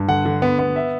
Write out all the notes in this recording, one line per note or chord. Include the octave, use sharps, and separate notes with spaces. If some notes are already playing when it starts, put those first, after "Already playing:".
Already playing: G2
D3 F#5
D3
B3
B3
E5